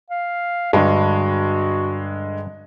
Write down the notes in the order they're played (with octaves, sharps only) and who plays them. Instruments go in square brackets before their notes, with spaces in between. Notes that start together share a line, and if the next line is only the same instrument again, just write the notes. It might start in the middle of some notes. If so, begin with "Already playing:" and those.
[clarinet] F5
[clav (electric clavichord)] G2 [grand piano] D3 G#3 [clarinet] F#4